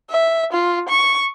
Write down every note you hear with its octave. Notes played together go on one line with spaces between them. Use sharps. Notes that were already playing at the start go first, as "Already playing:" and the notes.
E5
F4
C#6